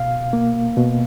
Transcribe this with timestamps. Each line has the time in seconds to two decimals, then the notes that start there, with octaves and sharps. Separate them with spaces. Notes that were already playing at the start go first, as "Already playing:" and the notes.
Already playing: B2 F5
0.33 A#3
0.77 B2